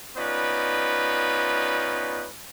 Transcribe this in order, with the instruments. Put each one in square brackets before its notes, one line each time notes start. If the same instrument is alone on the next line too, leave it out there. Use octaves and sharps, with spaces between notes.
[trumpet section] B3 C#4 D#4 F4 B4 D5